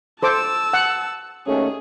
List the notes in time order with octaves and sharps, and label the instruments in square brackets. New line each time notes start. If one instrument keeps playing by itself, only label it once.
[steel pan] A4 C5 D6 [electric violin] A5 E6
[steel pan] F#5
[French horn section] D#2 A3 C#4 [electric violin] G#4